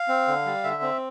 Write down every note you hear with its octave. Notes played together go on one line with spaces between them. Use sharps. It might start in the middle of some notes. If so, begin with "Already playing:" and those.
Already playing: F5
C4
D3
G3
D3 E5
C4